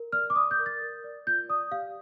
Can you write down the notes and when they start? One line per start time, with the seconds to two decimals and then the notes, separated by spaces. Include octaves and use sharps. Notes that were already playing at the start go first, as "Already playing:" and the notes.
Already playing: A#4
0.12 D5 F6
0.30 D6
0.35 D5 D#6
0.51 G6
0.59 A#4
0.66 A6
0.82 A#4
1.04 D5
1.27 F4 G6
1.49 D5 D#6
1.71 G4 F5